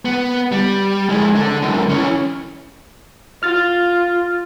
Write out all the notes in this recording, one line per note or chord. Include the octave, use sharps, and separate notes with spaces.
B3
G3
F2 G#3
D4 A4
C#2 F#2
E3 C#4
F4 F6 A6